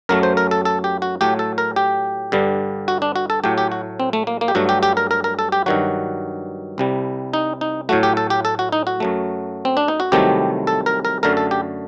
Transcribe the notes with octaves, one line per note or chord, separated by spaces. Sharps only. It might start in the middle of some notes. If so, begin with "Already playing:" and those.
F#2 F#3 A3 A#4
C5
A#4
A4
A4
G4
F#4
A2 F#3 A3 G4
A4
A#4
G4
G2 D3 G3
F#4
D4
F#4
A4
A2 F#3 A3 G4
G4
F#4
C4
A3
A#3
A#3
G4
G2 F#3 A3 F#4
G4
G4
A#4
A#4
A#4
A4
G4
G2 D#3 F#3 F#4
C2 C3 G3
D#4
D#4
A2 F#3 A3 F#4
G4
A4
G4
A4
F#4
D#4
F#4
F#2 F#3 A3
C4
D4
D#4
F#4
C2 C3 D#3 F#3 A3 G4
A4
A#4
A#4
F#2 D3 A3 A#4
A4
G4